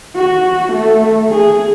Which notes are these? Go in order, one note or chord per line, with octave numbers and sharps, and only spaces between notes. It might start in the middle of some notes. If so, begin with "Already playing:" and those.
F#4
A3
G#4